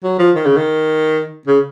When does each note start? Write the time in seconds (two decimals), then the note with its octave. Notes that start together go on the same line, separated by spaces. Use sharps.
0.04 F#3
0.19 F3
0.36 D#3
0.46 C#3
0.57 D#3
1.48 C#3